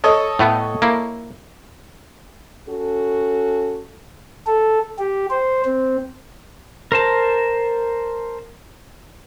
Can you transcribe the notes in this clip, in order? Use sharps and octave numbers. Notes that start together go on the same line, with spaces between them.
A4 C#5 D#5
A2 A3 B3
A#3 E4
C#4 F#4 A4
A4
G4
C5
C4
A#4 C5 A5